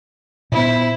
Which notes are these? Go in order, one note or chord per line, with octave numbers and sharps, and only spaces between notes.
A#2 B3 E4 C5